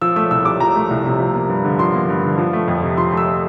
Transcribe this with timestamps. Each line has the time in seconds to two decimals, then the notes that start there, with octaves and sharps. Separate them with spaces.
0.01 F3 E6
0.16 A3 E6
0.31 C2 E6
0.45 C3 D6
0.60 F3 A#5
0.76 A3
0.91 C2
1.05 C3
1.20 F3
1.35 A#3
1.49 G2
1.64 D3
1.79 F3 C6
1.94 A#3
2.09 G2
2.23 D3
2.38 F3
2.53 A3
2.68 F2
2.83 C3
2.97 F3 C6
3.12 A3 E6